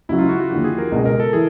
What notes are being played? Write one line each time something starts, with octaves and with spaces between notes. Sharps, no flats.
C#2 C#3 F#3 E4
F4
F#4
F#4
D#2 D3 F3 G4
G#4
A#4
C#2 B2 G#3
A#4
A4
E3 G#4